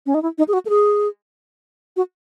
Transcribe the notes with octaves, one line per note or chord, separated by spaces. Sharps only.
C#4
D#4
E4
D#4
G#4
F#4
A4
G#4
F#4